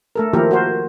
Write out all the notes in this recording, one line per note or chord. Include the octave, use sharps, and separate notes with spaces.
A3 A4 A#4
D#3 F3 A#3 E4 G4 A#4
F#4 A#4 C5